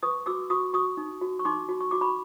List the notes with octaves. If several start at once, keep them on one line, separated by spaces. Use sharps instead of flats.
B4 C#6 D#6
F#4 D6 E6
F#4 C#6 D#6
F#4 C#6 D#6
D#4
F#4
C#6
D#4 C6 D6
F#4
C#6
F#4 D6
B5 C#6